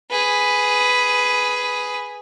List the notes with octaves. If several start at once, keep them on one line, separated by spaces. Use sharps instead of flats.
G#4 B4